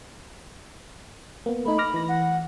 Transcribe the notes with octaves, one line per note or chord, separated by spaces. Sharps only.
A#3 B3
A3 D#4 B5
D6 F6 A#6
E3 A#6
F#5